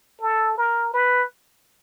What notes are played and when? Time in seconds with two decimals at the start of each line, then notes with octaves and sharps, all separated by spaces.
0.21 A4
0.57 A#4
0.94 B4